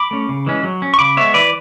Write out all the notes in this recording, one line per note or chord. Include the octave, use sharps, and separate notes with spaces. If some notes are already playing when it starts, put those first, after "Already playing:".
Already playing: B5 D6
A3 C#4
C#3
E3 G#3 C#4
F#3
C#4
C#6
C#3 B5 D6
G#3 B3 C#5 E5
E3 B4 D5